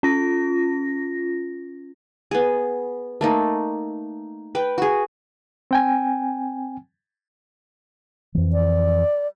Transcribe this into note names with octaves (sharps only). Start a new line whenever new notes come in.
C#4 F4 A#6
B3 G#4
A3 A#3 D#4
B4 G5
F#4 G#4
C4 G5 G#5
F2 E3
D5